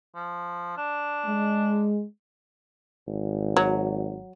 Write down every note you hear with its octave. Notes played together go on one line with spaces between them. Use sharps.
F3
D4
G#3
G#1
F#3